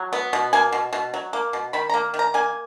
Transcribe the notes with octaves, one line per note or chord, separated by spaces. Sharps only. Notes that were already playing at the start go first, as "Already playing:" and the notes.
Already playing: F#3
B3
B2
A#3 G#5
B2
B2
F#3
A#3
B2
D#3 B5
A#5
A#3
D#3
A#5
A#3 G#5